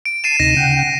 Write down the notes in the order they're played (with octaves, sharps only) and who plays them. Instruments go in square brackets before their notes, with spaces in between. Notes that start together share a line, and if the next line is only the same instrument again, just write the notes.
[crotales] D7
[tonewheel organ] A5 [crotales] C7 D#7 E7
[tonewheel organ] D2 C3 D#4 [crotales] A#6
[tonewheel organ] C#3 F#5 G5